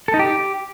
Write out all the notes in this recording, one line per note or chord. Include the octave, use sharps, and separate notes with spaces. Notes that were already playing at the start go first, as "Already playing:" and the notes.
A4
D#4
G4